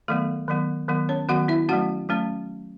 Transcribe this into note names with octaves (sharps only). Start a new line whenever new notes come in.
D#3 F#3 A3 B3 A4
D#3 F#3 B3
D#3 F#3 B3
C#4 C#5
D#3 F#3 B3 F#4 F#5
E4 E5
F#3 A3 C#4 F#4 F#5
F#3 A3 C#4